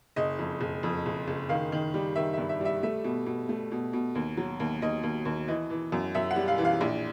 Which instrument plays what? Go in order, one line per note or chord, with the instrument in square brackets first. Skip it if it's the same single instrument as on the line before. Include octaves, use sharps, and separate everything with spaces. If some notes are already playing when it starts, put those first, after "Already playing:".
[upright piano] F#1 D#5
F2
F#1
F2
F#1
F#1
D#3 F5
D#3
G3
D#3 E5
G2 E5
E5
G3 E5
A3 E5
B2
B2
A3
B2
B2
D#2
F#3
D#2
D#2 D#5
D#2
D#2
E3 D#5
E3
F#2
F#2 E5
F#5
G3
F5
E3
F5
A#1